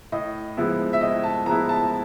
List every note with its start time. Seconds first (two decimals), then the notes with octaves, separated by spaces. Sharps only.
0.12 A2 D#5
0.57 F3 G#3 B3 E4
0.93 E5
1.01 A2 D#5
1.24 A5
1.46 F3 G#3 B3 E4 A#5
1.69 A5